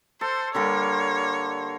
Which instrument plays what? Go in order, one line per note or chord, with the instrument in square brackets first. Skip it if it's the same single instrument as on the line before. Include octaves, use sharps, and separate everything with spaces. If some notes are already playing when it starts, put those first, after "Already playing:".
[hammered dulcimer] A4 [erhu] C5
[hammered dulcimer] D3 G3 A#3 [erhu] C#5